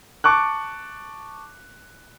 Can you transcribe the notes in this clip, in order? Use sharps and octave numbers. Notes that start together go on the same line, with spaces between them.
A5 C#6 D6 F#6